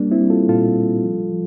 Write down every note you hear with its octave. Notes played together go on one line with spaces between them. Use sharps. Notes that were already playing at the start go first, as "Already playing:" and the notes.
Already playing: G3 A#3 D4
C4 E4
G3
F4 A4
A#2 F4 A4
G3
F3
F3